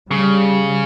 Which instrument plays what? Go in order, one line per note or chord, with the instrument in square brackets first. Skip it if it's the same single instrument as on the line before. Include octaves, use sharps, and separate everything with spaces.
[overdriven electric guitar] C#3 [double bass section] G3